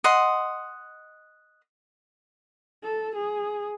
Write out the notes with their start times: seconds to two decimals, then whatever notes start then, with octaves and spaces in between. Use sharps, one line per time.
0.04 D#5 F#5 C6
2.83 A4
3.16 G#4